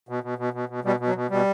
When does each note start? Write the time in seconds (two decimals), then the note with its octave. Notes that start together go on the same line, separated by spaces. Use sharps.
0.09 B2
0.23 B2
0.38 B2
0.53 B2
0.69 B2
0.84 B2 G3
1.00 B2
1.07 F#3
1.15 B2
1.30 B2 G3